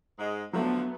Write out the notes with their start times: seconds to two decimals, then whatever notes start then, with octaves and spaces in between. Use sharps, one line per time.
0.18 G#2 G#3
0.53 D3 F3 F#3 A3 B3